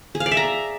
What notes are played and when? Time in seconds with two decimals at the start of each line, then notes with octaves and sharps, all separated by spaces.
0.15 G#4
0.20 F5
0.26 D5
0.31 E5
0.37 A#5